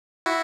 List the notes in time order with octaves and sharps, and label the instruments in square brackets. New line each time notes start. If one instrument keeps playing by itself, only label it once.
[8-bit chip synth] E4 F#4